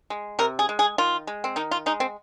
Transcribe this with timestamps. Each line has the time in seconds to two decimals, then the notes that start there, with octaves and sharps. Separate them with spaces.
0.10 G#3
0.39 C3 A#4
0.59 G#4
0.69 G#3
0.79 G#4
0.98 D#3 F4
1.27 G#3
1.44 C4
1.56 D#3 D#4
1.71 F4
1.86 G#3 D#4
2.00 C4